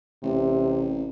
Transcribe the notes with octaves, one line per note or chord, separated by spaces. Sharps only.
A1 C3